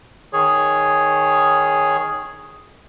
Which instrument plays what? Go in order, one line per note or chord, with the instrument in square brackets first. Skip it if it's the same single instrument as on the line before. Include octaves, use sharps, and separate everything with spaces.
[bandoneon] D#3 G#4 C#5